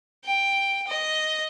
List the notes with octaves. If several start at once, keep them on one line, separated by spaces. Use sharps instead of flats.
G5
D#5